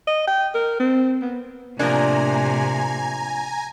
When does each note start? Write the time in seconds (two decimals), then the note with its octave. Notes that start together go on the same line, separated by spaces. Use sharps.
0.07 D#5
0.27 G5
0.54 A#4
0.80 C4
1.22 B3
1.79 A2 C3 F3 A#3 D4 G#5 A#5